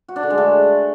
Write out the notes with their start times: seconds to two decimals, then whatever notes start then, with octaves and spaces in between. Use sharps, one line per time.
0.08 F#4
0.16 D4
0.23 D3
0.30 G#3
0.38 A3